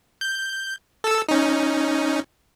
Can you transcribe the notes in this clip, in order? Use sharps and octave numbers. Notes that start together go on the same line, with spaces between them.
G6
A4 E6
C#4 D#4